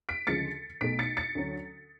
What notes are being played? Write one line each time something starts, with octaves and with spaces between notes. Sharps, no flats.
B6 D7
D2 C#3 F3 G#3 A6 C#7
B1 B2 A3 B6 D7
A6 C#7
A6 C#7
D2 D3 F#3 C#4